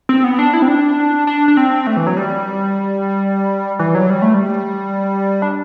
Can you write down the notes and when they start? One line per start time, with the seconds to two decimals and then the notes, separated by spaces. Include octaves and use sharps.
0.09 C4
0.24 B3
0.39 D4
0.54 E4
0.62 C4
0.68 D4
1.27 D4
1.48 D4
1.57 C4
1.87 A3
1.97 E3
2.07 F#3
2.17 G3
3.79 E3
3.95 F#3
4.10 G3
4.22 A3
4.34 G3
5.42 D4